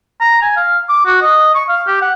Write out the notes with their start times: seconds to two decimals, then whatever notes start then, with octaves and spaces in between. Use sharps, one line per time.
0.21 A#5
0.42 G#5
0.57 F5
0.89 D6
1.06 F#4
1.22 D#5
1.55 C#6
1.69 F5
1.87 G4
2.01 F#5